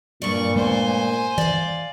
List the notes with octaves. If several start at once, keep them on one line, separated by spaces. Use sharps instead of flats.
G2 A#2 D5 C#6
G#3 A3 B3 C5 G#5
E3 D5 F5